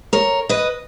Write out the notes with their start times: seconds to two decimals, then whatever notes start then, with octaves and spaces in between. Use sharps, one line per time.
0.13 A#4 C#5
0.49 B4 D#5